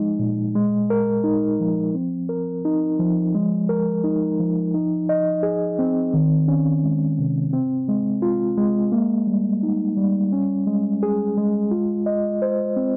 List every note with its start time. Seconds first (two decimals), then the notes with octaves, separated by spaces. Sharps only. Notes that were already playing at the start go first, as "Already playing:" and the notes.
Already playing: F3 G#3 D#4
0.19 A#2
0.55 G#3
0.90 A#4
1.24 D#4
1.60 F3
1.95 C4
2.29 A#4
2.65 D#4
2.99 F3
3.35 G#3
3.69 A#4
4.04 D#4
4.39 F3
4.74 D#4
5.09 D#5
5.43 G#4
5.79 C4
6.14 D#3
6.48 C#4
6.84 G#3
7.19 C3
7.53 C4
7.88 G#3
8.22 F4
8.58 G#3
8.92 A#3
9.27 G3
9.63 D#4
9.97 G3
10.32 C#4
10.67 G#3
11.03 G#4
11.37 G#3
11.71 F4
12.06 D#5
12.42 C5
12.77 C4